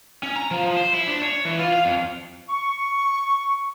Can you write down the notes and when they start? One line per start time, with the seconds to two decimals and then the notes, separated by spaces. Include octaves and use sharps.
0.23 C#4
0.36 A#5
0.51 F3
0.65 F3
0.77 C5
0.93 E4
1.08 D4
1.22 C#5
1.45 E3
1.59 F4
1.73 F5
1.85 F2
2.49 C#6